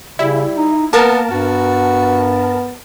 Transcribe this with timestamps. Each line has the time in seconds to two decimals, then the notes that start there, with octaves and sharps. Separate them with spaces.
0.19 C#3 G3 E4
0.57 D#4
0.93 A#3 B3 A#4 A5
1.31 G2 B3 F#4